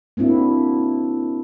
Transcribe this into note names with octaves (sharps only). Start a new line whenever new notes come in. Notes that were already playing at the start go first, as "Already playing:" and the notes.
A#3 C4 D4 E4 F#4